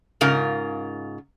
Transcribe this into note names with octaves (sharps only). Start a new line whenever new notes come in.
G#2 C#3 F4 A#4